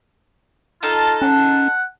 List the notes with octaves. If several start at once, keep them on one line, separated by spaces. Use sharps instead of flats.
D#4 F4 A4
C#4 F#5